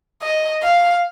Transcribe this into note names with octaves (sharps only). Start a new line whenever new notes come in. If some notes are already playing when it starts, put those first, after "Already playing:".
D#5
F5